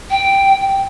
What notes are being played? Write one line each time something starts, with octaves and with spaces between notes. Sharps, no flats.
G5